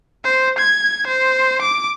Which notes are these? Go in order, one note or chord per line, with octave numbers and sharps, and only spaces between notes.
C5
G#6
C5
D6